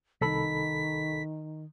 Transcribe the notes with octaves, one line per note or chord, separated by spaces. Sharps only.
C2 D#3 A4 B5 B6